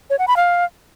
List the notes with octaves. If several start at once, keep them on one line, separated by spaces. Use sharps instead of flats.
C#5
F#5
B5
F5